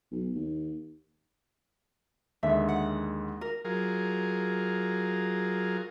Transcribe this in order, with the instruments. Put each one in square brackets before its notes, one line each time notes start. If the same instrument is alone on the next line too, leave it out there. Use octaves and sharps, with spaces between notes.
[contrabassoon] B1
D#2
[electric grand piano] D#2 D3 G#3 [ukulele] E5
[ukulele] F#5
A#4
[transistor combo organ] F#3 F4 G#4 A#4